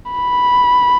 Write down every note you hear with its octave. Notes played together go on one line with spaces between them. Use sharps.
B5